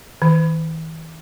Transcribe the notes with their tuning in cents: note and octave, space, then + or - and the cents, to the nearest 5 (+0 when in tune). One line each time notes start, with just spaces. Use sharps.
E3 -45